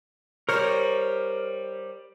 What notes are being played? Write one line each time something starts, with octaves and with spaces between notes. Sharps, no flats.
G3 A#4 C5 C#5